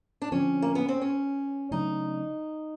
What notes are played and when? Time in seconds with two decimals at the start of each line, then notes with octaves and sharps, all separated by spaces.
0.22 D4
0.32 D3 F3 G#3 C4 C#4
0.62 A#3
0.75 B3
0.89 C4
1.02 C#4
1.71 C#3 F#3 A3 D4 D#4